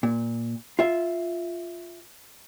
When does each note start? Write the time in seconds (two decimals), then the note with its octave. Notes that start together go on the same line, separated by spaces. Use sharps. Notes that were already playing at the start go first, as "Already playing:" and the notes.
0.03 A#2
0.79 F4 E5